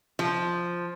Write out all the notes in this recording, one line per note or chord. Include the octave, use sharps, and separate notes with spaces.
F3